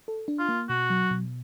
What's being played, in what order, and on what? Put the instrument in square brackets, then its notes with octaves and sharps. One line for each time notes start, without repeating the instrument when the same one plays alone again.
[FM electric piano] A4
D4
[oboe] F4
[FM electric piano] A#3
[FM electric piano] B2 [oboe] F#4
[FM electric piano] F#3
B2